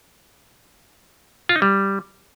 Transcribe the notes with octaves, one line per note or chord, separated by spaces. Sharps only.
F4
D#4
G3